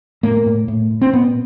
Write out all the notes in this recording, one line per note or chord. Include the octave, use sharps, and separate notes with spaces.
A2 A#3
A2
A2
A2
C4
A#2 B3